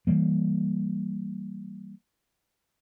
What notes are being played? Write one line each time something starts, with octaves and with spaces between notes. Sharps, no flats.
E3 F3 G3 A#3